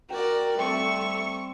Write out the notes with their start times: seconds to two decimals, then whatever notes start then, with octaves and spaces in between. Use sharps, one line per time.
0.10 F#4 A#4 D5 G5
0.59 G3 A3 C4 C#6 E6